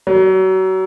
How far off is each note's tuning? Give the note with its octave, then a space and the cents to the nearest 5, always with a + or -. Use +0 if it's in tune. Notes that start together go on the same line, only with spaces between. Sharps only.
F#3 +30